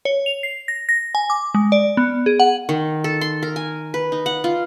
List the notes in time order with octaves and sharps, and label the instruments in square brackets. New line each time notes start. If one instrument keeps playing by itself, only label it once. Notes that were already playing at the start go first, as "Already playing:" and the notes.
[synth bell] C#5
F7
C7
A#6
A#6
G#5
D6
G#3
D5
B3
G#4
F#5
[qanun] D#3
A4
C6
A#4
G#5
B4
D#4
F#5
F4